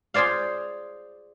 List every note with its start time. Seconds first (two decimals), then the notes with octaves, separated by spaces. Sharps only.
0.14 F4 G#4 C5 D5 F5